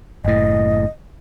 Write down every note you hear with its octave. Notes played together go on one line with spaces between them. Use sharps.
F#1 A2 D#5